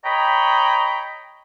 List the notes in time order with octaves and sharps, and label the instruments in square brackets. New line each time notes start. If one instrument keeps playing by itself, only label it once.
[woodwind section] C#5 D#5 G5 A#5 B5